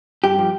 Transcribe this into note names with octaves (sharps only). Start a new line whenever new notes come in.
G2 G4
F3